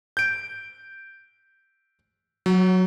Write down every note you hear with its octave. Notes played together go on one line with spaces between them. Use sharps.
G6 D7
F#3